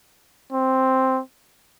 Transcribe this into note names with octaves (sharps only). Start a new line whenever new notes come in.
C4